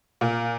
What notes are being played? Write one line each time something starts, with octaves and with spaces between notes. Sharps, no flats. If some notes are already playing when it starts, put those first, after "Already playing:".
A#2